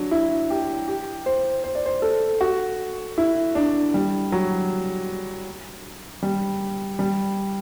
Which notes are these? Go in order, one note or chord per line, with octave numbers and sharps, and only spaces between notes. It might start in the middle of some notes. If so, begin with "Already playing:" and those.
Already playing: F#3 D4
E4
G4
G4
C5
C5
D5
C5
A4
F#4
E4
D4
G3
F#3
G3
G3